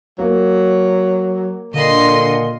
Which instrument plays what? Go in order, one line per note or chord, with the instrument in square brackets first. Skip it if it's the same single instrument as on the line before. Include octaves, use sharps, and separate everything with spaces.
[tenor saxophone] F#3 [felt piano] A#3
[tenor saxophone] A#2 [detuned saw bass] D3 [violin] D#5 C6